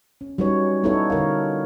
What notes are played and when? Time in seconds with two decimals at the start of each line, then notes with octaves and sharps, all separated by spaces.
0.21 C#4
0.38 F#3 G3 C#4 D#4 B4 C#5
0.83 B3 D#4 E4 A4 B4 C#5
1.10 D3 A#4 F5